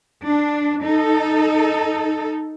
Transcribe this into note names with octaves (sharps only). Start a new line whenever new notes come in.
D4
D#4 A4